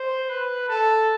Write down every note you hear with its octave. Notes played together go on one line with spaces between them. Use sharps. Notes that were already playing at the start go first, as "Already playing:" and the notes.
Already playing: C5
B4
A4